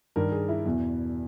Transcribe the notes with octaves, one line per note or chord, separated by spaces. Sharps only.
G2 D#3 A#4
G#4
E4
E2 B2